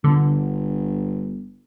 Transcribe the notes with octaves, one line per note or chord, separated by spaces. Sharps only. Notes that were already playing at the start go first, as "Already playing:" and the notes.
G1 D3